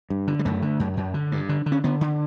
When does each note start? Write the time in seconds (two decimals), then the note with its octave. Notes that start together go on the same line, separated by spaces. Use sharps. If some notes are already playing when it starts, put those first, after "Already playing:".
0.10 G2
0.28 D3
0.39 G3
0.45 F#2 A3
0.62 D3
0.80 F#2
0.97 F#2
1.14 D3
1.32 G2
1.49 D3
1.66 D3
1.72 C#4
1.84 D3 B3
2.01 D3